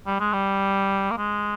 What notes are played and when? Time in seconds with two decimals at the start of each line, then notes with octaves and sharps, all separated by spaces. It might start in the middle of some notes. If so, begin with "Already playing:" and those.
0.07 G3
0.20 G#3
0.33 G3
1.11 A#3
1.18 G#3